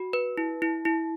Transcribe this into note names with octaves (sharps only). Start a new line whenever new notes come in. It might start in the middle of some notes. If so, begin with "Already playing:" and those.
Already playing: F#4
B4
E4
E4
E4